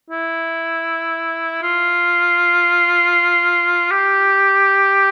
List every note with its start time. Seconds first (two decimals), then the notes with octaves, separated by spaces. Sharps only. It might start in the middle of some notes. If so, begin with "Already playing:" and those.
0.10 E4
1.62 F4
3.91 G4